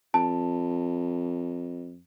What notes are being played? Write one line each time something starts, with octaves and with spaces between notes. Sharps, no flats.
F2 A5